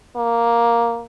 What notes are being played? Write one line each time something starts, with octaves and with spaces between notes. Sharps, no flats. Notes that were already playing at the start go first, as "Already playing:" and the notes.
A#3